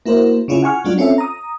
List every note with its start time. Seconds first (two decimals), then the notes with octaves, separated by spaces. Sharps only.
0.06 A#3 E4 F#4 A#4 C5
0.48 C#3 C#4 E4 F4 G#4
0.63 F#5 G#5 C#6 F6
0.84 F#3 G#3 D4 F4 F#4
0.98 C4 C#4 F4 A4 E5
1.18 A#5 D#6